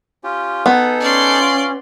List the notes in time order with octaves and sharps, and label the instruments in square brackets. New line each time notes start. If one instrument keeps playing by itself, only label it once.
[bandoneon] C#4 F4 G4
[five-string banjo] B3 [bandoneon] D#4 G#4 A4
[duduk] C#4 [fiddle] D5 C6
[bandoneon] F4